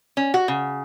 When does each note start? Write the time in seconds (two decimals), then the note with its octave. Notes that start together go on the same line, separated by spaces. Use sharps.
0.17 C#4
0.34 F#4
0.48 C#3